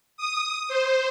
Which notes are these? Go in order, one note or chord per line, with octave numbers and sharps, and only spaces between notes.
D#6
C5